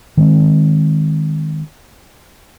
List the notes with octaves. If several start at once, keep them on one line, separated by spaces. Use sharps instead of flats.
D#3 G#3 C4